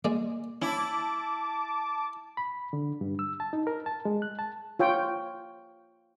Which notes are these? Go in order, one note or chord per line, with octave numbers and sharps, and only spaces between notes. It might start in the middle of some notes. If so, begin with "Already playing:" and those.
G#3 A#3 D5
C#4 E4 A5 D6
B5
D3
G2
E6
A5
D#4
A#4
A5
G#3
F#6
A5
F4 C#5 G5